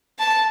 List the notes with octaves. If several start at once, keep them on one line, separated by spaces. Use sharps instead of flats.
A5